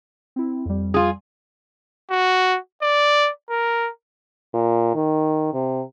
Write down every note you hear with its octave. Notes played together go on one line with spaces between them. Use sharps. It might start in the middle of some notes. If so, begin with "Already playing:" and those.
C4 E4
F2 G3
F4 G#4
F#4
D5
A#4
A#2
D#3
C3